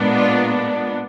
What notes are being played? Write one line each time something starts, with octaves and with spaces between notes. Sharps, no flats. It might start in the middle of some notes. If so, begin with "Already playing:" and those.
Already playing: A#2 G#3 B3 D4
F4